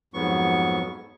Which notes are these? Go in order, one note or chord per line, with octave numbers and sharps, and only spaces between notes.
F2 G#2 F#3 B3 C#6